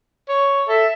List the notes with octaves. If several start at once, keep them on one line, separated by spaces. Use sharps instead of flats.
C#5
A4 E5